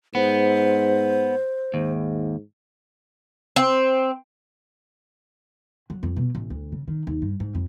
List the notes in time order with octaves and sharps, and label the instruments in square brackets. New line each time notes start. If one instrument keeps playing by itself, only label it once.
[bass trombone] G#2 [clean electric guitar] B3 [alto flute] C5
[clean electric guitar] D#2 [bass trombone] G#2
[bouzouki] C4
[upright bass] F#3
F2
B2
A1
D2
C#3
D#3
D#2
G2
G#2
F2